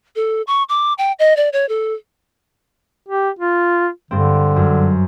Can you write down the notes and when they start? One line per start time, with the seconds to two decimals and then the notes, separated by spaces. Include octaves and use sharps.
0.16 A4
0.47 C#6
0.69 D6
0.98 G5
1.19 D#5
1.37 D5
1.53 C#5
1.69 A4
3.09 G4
3.39 F4
4.11 G2 D3 C4
4.56 F#2